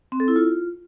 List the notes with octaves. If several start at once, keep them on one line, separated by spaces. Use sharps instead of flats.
C4
A4
E4
F4